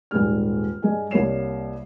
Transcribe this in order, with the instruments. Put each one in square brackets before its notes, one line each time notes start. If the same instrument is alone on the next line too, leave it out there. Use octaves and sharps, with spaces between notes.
[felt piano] D#1 G#2 G3 G#3 F6
G2 G#4 D#5 G#5
C2 G3 A#3 C#5 C7 E7